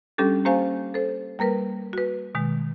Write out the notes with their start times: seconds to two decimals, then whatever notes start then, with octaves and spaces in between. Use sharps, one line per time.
0.18 G3 C#4 D4 G4 A4
0.45 A#3 C#4 G4 C5 F5 G#5
0.94 A4 C5
1.39 G3 A#3 A#4 B4
1.93 F#4 B4
2.35 B2 D#3 G#3